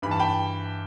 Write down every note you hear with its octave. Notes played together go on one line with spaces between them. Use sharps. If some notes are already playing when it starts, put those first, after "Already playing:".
G2 E3 B5
A5
G5 B5